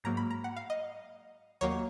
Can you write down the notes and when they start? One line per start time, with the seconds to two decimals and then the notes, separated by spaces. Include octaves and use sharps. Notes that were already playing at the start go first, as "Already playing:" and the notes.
0.04 G#2 F#3 A#3 A#5
0.17 B5
0.30 A#5
0.44 F#5
0.56 F5
0.70 D#5
1.61 D#2 D#3 F#3 A#3 C#5